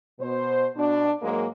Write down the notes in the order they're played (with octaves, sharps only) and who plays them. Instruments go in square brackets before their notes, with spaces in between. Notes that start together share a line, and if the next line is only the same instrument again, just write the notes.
[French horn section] B2 C5
B2 D4
G#2 F#3 G#3 A#3